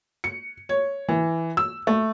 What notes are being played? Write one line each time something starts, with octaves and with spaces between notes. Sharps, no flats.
C#7
C#5
E3
E6
A3